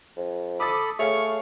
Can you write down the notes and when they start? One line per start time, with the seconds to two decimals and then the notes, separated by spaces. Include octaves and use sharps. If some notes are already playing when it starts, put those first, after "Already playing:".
0.16 F2
0.60 A4 B5 D6 D#6 A6
0.99 A3 G#4 C#5 F5 C#6